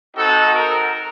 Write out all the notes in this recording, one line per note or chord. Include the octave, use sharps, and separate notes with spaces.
C4 D#4 F#4 A4
A#4